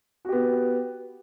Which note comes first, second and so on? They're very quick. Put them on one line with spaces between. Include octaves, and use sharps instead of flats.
F#4 G4 B3